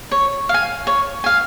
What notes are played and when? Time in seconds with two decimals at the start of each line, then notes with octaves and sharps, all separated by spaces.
0.11 C#5
0.49 F5 G#5
0.87 C#5
1.24 F5 G#5